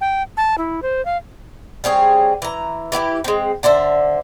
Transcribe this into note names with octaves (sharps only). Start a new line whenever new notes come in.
G5
A5
E4
C5
F5
G3 C4 G#4 C#5
E3 A#5
E3 E4 F#4 G4
G#3 C4
D3 D4 C5 E5